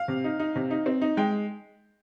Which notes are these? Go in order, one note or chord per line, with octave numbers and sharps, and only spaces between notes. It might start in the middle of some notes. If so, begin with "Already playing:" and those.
Already playing: F5
C3
D#4
D#4
C3
D#4
C4
D#4
G#3 G5